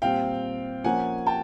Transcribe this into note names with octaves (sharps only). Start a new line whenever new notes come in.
A#2 G3 C4 F5 G5
F3 A#3 C#4 F#5 G#5
G5 A5